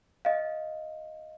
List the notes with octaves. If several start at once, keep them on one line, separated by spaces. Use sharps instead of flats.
D#5 F5